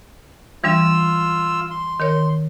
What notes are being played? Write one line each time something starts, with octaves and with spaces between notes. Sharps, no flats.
E3 G3 D4 F4 E6
C6
D#3 A#4 C#5